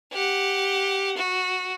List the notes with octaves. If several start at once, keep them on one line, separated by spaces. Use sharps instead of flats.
G4 F#5
F#4